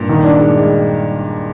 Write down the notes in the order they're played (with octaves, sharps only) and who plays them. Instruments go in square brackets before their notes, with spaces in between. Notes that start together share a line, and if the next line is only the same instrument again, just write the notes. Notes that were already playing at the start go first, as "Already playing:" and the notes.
Already playing: [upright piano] G2 A#2
[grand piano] D#3
D4
G#3
G#3